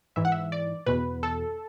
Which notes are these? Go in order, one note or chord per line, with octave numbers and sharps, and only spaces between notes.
G#2 E3 E5
F#5
E5
D5
E2 B2 B4
A4